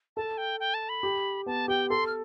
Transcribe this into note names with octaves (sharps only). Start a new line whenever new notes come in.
A4 A5
G5
G5
A5
B5
G4
B3 A5
G4 G5
A4 C6
F6